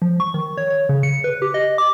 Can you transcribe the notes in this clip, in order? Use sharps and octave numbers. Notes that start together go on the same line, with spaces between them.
F3
C#6
D#3
C#5
C#5
C#3
C#7
B4
G4
D#5
D6